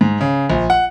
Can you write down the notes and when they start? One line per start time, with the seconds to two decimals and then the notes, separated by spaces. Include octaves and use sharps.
0.01 G#2
0.21 C#3
0.50 A#1
0.70 F#5